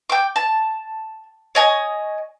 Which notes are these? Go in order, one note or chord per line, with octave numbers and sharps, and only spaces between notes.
G5 D6
A5
C#5 D#5 G#5